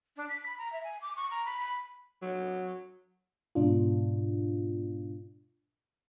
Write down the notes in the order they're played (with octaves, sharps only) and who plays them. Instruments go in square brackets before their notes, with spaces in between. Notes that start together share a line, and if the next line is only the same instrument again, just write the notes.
[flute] D4
B6
B5
A#5
E5
G#5
D6
C#6
A#5
B5
B5
[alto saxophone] F#3
[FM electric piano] G#2 B2 D4 F4